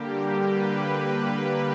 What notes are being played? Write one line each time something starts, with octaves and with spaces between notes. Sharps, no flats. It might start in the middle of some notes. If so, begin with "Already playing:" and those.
Already playing: D3 G3 A#3 G4
B4